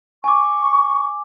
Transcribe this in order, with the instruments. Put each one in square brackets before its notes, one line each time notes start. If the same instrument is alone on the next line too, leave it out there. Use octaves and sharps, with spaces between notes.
[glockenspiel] G#5 D6 [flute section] C#6